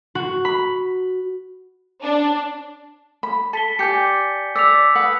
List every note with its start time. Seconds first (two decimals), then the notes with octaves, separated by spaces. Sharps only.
0.15 F#4
0.45 B5
2.02 D4
3.23 B5
3.53 A4 A5 B6 G7
3.79 G4 D5 G#5 G6 C#7
4.56 D5 E6 B6 F7
4.95 B4 F#5 D#6